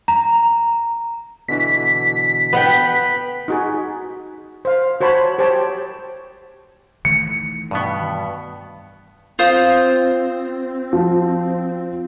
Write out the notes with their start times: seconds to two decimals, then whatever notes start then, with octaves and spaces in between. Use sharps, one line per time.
0.08 A#5
1.48 B2 D3 E3 B6
2.53 B3 F#5 G5
3.48 D#4 F#4 G#4
4.65 C5 F5
5.01 F#4 C5 C#5 A5 B5
5.38 G4 C5 C#5 G5 A5
7.05 D#3 E3 A3 C#7
7.71 G2 B2 B3
9.39 C4 F4 C5 D#6
10.93 F3